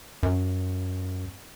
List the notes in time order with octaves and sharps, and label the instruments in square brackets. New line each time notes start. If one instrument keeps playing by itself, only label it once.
[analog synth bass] F#2